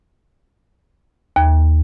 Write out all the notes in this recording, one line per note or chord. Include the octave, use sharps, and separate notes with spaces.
D#2